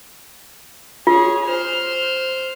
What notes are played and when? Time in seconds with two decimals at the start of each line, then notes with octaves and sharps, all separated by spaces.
1.07 F4 G#4 C#5
1.45 C5 F6